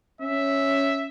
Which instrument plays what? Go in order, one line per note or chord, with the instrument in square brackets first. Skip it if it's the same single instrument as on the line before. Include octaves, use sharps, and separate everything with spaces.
[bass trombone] C#4 [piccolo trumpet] E5